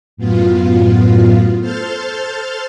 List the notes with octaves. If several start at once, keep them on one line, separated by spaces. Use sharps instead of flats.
F#2 A2 B3 F4
A4 C5 F6 G6 A6